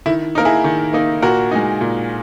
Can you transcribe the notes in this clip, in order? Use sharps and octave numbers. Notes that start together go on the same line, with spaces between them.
D#3 E4
A#3 D#4 A#4
E4 G#4
D#3
A#3 D#4
A#2 F#4 A#4
G#3 D#4
A#2